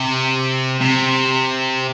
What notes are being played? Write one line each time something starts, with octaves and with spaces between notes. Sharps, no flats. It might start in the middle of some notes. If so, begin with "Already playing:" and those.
Already playing: C3
C3